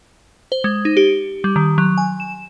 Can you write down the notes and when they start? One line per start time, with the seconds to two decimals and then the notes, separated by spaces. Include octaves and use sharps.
0.52 C5
0.64 G#3
0.85 D#4
0.97 G4
1.44 G3
1.56 D#3
1.78 F#3
1.98 G#5
2.20 E7